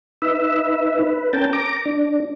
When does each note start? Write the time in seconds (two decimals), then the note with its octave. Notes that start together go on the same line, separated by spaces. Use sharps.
0.22 D#4 B4 E5
1.03 B4
1.33 C#4 A#4 G5 A5
1.53 A#5 D6
1.86 D4